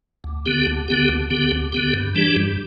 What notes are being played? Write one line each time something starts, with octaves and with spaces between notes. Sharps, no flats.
D2
D3 B3 G4
D2
D3 B3 G4
D2
D3 B3 G4
D2
D3 B3 G4
G2
E3 G3 D4 G4
G2